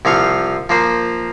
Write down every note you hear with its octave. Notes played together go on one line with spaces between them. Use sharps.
C2 F3 F5 C#6
F3 A#3 C5